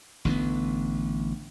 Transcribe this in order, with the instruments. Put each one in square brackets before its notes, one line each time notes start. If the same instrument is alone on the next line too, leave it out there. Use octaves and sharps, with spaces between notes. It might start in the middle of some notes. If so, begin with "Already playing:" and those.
[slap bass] A1 D3 F#3 B3